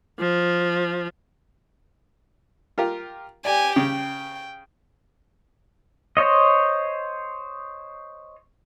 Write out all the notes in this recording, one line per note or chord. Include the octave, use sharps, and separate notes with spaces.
F3
F4 G4 A#4
G4 D5 G#5
C#3 G5
C5 C#5 D#5